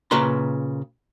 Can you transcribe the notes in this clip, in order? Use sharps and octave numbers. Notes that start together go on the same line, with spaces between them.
A#2 C#3 B4 A#5 C6